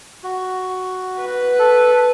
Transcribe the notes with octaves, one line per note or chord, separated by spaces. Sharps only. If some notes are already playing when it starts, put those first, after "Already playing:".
F#4
B4
A4